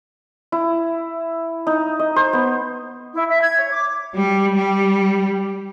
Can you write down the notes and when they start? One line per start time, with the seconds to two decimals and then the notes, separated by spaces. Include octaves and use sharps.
0.52 E4
1.67 D#4
1.99 D#5
2.16 C5
2.33 B3
3.14 E4
3.28 E5
3.41 G#6
3.58 C#5
3.72 D6
4.15 G3
4.55 G3